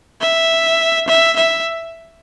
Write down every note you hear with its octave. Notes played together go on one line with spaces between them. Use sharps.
E5
E5
E5